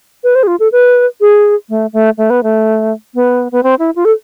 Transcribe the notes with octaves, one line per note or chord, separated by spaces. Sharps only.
B4
C5
G#4
F4
A4
B4
G#4
A3
A3
A3
B3
A3
B3
B3
C4
E4
F4
A4